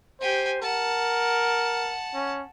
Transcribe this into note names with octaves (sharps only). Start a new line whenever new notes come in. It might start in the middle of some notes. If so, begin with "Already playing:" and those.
G4 C5 G#5
A#4 F#5 A5
C#4